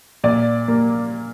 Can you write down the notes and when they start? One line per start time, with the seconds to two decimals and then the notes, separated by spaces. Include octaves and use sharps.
0.24 A#2 D5
0.68 A#3